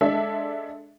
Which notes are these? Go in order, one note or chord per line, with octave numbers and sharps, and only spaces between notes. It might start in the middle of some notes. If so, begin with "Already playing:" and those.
G#3 D4 A4 E5